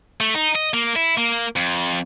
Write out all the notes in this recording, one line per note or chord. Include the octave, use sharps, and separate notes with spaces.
A3
D#4
D#5
A#3
E4
A#3
F2